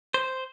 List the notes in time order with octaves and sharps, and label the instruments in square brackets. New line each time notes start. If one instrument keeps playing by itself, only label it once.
[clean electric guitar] C5